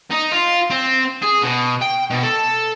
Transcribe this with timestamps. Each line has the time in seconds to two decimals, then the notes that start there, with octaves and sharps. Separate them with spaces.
0.11 D#4
0.32 F4
0.70 C4
1.22 G#4
1.43 B2
1.82 G5
2.10 B2
2.23 A4